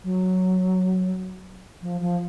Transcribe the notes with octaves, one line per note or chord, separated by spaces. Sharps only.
F#3
F3
F3